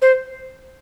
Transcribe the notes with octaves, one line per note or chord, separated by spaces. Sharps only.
C5